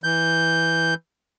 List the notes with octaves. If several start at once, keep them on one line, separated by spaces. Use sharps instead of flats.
E3 G6